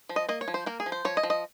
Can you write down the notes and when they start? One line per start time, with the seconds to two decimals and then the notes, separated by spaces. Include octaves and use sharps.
0.09 F3
0.16 D#5
0.29 A#3 D#5
0.41 C#5
0.48 F3
0.54 C5
0.66 A#3 A#4
0.80 G#4
0.86 F3
0.92 C5
1.05 F3 C#5
1.17 D#5
1.23 F3
1.30 D#5